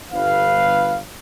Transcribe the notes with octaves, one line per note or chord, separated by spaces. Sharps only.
G1 B4 F5